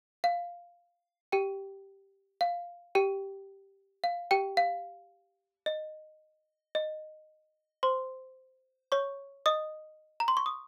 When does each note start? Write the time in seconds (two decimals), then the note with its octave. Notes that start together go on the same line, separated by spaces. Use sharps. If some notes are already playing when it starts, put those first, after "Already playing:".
0.24 F5
1.32 G4 G5
2.41 F5
2.95 G4 G5
4.04 F5
4.31 G4 G5
4.57 F5
5.66 D#5
6.75 D#5
7.83 C5 C6
8.92 C#5 C#6
9.46 D#5 D#6
10.20 A#5
10.28 C6
10.37 C#6
10.46 D#6